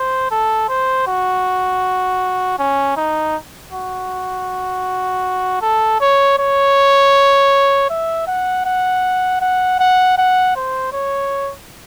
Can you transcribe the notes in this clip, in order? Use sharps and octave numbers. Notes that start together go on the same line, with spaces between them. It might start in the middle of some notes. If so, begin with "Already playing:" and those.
Already playing: C5
A4
C5
F#4
C#4
D#4
F#4
A4
C#5
C#5
E5
F#5
F#5
F#5
F#5
F#5
C5
C#5